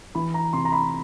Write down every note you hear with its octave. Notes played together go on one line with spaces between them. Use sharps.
E3 B5
A#5
C3 C6
A#5
B5